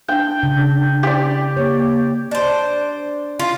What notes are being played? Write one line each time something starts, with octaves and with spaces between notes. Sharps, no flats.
D4 G5
C#3
G4 D5
A#3 C#5
D4 C5
F4